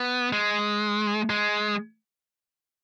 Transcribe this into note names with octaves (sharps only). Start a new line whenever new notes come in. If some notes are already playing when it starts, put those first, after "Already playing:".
Already playing: B3
G#3
G#3